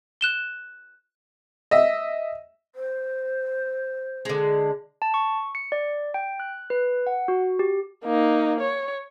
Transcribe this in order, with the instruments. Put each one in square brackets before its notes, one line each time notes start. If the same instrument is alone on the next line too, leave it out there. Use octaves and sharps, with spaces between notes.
[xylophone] F#6 E7 G7
[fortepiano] D#5 E5
[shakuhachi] C5
[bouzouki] D3 G#3
[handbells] A5
C#6
C#7
D5
G5
F#6
B4
F#5
F#4
G4
[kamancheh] A#3 D#4
C#5